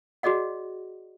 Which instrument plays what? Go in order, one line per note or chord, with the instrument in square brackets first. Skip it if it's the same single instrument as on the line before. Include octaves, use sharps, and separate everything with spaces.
[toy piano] F#4 G#4 D5 D#5 F#5